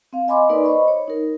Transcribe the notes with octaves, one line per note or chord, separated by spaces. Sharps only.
C4 F5
D#5 G#5 B5 C6 D6
A#3 D#4 A#4 B4 D5
C5 D#5 B5 C#6
C#5
D#4 A#4